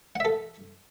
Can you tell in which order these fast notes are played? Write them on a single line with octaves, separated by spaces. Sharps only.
F#5 E5 A4